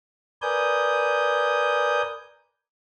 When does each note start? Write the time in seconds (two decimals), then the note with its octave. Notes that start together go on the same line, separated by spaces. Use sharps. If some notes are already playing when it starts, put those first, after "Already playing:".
0.42 A#4 B4 D5 G#5 D#6 G6